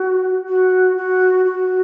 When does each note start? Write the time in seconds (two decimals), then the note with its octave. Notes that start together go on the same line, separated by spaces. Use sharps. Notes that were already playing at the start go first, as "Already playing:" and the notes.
Already playing: F#4
0.48 F#4
0.97 F#4
1.46 F#4